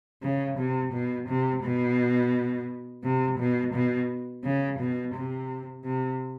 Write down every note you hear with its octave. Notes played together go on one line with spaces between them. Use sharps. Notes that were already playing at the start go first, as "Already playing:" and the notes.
C#3
C3
B2
C3
B2
C3
B2
B2
C#3
B2
C3
C3